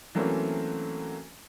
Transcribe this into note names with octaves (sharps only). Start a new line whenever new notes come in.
E3 F#3 A3 A#3 C4 C#4